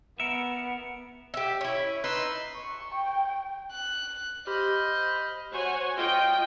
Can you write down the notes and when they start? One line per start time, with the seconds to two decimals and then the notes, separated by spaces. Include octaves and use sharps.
0.20 B3 A#4 E5 C#7
1.34 G4 E5
1.61 C#4 E4
2.04 D#4 B4 C6 E6
2.54 C#6
2.94 G5
3.71 F#6
4.47 G4 C5 D#5 B5 F6
5.52 F#4 C5 C#5 F#5 G#5
5.94 F4 D#5 G5